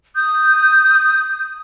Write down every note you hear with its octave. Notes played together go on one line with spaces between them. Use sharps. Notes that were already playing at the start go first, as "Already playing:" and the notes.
D#6 G6